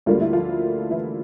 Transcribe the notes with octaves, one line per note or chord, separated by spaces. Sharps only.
D2 D3 G3 A#3 F4
E4
F3 F4
E3 E4